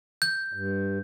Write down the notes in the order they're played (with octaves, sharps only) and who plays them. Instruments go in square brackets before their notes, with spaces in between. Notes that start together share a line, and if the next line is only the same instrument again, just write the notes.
[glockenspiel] G6
[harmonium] G2